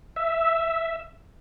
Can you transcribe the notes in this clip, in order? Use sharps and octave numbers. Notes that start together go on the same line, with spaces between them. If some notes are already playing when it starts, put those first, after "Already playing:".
E5